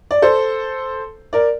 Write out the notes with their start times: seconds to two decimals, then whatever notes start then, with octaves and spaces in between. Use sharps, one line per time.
0.11 D5
0.22 A4 C5
1.33 A#4 D5